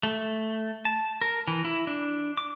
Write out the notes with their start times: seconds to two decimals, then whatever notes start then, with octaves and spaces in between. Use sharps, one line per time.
0.03 A3
0.85 A5
1.21 A#4
1.48 E3
1.65 E4
1.87 D4
2.37 D6